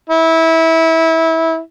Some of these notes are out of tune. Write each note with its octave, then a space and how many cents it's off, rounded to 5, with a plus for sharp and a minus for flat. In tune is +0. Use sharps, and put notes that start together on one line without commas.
E4 -20